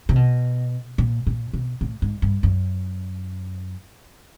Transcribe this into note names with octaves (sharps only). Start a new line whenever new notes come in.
C3
B2
A#2
A#2
B2
A2
G#2
G2
F#2